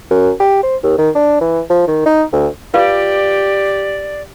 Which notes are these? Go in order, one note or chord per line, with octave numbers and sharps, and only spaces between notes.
F#2
G4
C5
D#2
D#3
D4
E3
F3
D#3
D#4
D2
F4 G4 B4 D5 F5